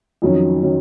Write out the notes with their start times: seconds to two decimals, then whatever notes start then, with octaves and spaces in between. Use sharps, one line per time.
0.22 F2 D#3 F#3 C#4
0.62 D#3 F#3 C#4